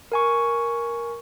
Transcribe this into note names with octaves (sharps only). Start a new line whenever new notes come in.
A#4 G#5 C#6